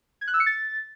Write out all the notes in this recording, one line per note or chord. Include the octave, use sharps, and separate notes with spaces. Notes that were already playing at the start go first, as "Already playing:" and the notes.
G#6
F#6
E6
C#7
A6